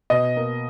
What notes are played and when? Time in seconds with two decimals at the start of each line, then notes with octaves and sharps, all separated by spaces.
0.10 B2 D#5
0.37 A#3